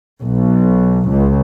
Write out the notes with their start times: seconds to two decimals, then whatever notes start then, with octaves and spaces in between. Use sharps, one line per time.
0.22 B1
1.09 C#2